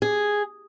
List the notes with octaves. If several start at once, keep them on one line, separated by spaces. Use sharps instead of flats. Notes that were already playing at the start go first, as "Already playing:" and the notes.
G#4